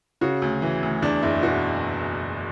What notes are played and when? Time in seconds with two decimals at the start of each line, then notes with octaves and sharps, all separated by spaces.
0.21 C#3 F#4
0.42 D2
0.62 E3
0.83 D2
1.02 E2 D4
1.22 F#1 E4
1.43 B2 F#4